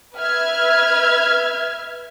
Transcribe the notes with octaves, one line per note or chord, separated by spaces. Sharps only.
B4 E5 F6 G#6